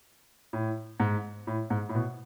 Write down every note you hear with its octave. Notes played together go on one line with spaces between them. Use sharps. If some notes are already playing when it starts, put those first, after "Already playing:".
A2
G#2
A2
G#2
A2
B2